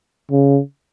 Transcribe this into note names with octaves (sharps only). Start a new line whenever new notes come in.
C#3